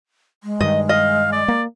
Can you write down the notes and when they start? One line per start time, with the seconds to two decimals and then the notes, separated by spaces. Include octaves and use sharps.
0.44 G#3
0.60 G2 D#3 D#5
0.89 D#5 F5
1.33 D5
1.48 A#3